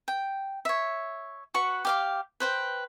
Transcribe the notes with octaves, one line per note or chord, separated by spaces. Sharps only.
G5
C#5 E5
F#4 B4 C#6
G4 F5 D6
B4 C5 G5